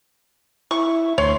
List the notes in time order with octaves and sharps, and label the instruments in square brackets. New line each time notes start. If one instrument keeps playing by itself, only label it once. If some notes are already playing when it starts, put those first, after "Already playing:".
[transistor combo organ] E4 [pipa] C#6
[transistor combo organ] D2 C6 [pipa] C#5